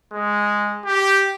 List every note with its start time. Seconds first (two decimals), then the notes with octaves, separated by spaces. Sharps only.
0.12 G#3
0.85 G4